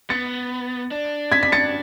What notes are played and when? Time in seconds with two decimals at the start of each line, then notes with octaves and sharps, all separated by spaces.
0.10 B3 A6 C#7
0.91 D4
1.32 G#6 B6
1.43 B6
1.52 A6 C#7